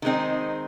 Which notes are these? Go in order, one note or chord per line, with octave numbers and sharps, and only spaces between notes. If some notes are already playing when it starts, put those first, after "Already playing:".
D#3 G#3 C4 D#4